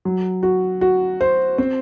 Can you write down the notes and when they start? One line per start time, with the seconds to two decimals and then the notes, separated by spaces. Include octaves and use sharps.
0.05 F#3
0.43 F#4
0.81 F#4
1.21 C5
1.58 C4